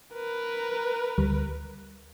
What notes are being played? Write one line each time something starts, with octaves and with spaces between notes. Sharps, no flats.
A#4 B4
D2 G3